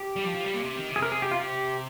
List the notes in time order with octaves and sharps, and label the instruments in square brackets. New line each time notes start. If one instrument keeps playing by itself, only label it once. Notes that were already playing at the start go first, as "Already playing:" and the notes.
Already playing: [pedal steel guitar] G4
[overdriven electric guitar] G3
F3
F3
G3
A#2
C3
D#3
C3
[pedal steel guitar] G#4
[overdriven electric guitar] C3 [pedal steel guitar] A#4
[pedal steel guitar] G#4
G4
F4
G4